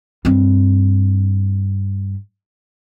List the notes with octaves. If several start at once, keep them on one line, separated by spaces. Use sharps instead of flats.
G2 C4